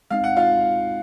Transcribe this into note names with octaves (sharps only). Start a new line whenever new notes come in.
G#3 C4 D#4 F5
F#5
F4 F5